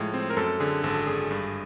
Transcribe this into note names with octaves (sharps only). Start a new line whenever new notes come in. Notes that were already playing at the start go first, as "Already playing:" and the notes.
Already playing: A2 F3 G#3
C4
A#4
F#2 A4
D3 G#4
G#1 A4
G#1 G#4
G2